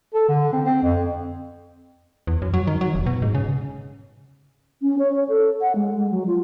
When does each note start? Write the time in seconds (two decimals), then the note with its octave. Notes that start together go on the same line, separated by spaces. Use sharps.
0.14 A4
0.28 D3
0.53 C4
0.65 C4
0.83 F2
2.27 E2
2.42 F#2
2.54 F#3
2.67 D#3
2.81 F#3
2.95 F1
3.06 B2
3.22 G#2
3.35 C#3
4.82 C#4
4.99 C#5
5.15 C#5
5.29 A4
5.61 F#5
5.75 G#3
5.96 G#3
6.11 F#3
6.27 F4